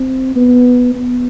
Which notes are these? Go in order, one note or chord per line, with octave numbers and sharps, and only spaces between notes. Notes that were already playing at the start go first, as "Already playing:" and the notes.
Already playing: C4
B3
B3